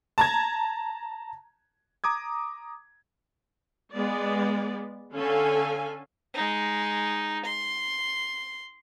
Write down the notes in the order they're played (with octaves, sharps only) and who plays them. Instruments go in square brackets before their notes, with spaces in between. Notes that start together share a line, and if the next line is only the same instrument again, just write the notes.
[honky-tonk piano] A5 A#5 G#6
[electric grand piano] A#5 D6 D#6 G#6
[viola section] G#3 B3 D5
D3 C#4 A4 F5 G#5
[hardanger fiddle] G#3 D#4
C6